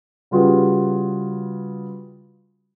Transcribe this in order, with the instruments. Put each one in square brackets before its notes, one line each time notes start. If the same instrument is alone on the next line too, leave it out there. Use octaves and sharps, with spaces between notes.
[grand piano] C#3 G3 F4 F#4 G#4 B4